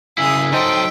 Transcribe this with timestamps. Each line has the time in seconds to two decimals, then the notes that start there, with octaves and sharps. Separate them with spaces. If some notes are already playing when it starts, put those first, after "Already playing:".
0.18 C#3 E4 G#4 D#6 E6 B6
0.53 F#3 D#4 A4 C5 D#5 G5